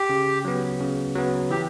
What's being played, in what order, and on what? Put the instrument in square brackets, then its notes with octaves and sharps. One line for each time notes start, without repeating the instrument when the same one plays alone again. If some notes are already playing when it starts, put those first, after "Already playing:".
Already playing: [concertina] G4
[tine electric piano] C#3
F#3 B3
C#3
F#3 B3
[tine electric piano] E3 [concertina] G4